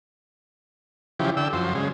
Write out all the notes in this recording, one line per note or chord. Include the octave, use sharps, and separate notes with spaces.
C#3 E3 F3 G4
D3 G5 E6
F#2 F3 C5
C#3 G#3